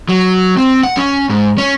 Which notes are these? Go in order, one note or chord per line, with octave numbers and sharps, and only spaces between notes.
F#3
C4
F#5
C#4
G#2
C#4